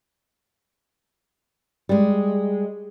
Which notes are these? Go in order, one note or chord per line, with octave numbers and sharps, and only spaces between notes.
G3 G#3